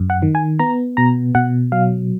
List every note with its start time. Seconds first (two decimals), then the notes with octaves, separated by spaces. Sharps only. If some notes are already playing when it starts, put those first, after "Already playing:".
Already playing: F#2
0.10 F#5
0.22 D#3
0.35 G#5
0.59 B3 A#5
0.97 B2 A#5
1.35 B2 F#5
1.72 F#3 F5